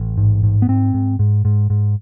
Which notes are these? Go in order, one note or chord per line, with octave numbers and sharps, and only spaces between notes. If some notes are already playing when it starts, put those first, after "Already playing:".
Already playing: A1
G#2
G#2
B3
G#2 C4
G#2
G#2
G#2
G#2